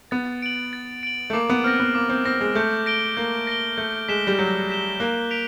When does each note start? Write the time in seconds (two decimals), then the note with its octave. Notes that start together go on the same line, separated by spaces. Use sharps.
0.11 B3 A6
0.42 D7 F#7
0.73 A6
1.03 D7 F#7
1.30 A3
1.33 A#3 D6
1.50 B3
1.64 C4 F6 A#6
1.80 B3
1.95 A#3 D6
2.09 C4
2.25 C4 F6 A#6
2.41 G#3
2.55 A3 G6
2.86 A#6 D7 G7
3.17 A#3 G6
3.47 A#6 D7 G7
3.78 A3 G6
4.08 G#3 B6 E7 G7
4.27 G3
4.39 F#3 G6
4.69 B6 E7 G7
5.00 A#3 F#6
5.30 B6 D7 F7